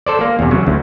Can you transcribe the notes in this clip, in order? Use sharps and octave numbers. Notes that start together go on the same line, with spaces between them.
A4 C5 D5
A#3
E2 C3
C#3 F#3
D2